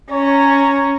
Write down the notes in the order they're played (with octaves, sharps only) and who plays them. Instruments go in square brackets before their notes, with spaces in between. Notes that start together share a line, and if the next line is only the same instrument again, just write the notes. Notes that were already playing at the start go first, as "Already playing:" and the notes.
[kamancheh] C#4 A#5 [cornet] C#5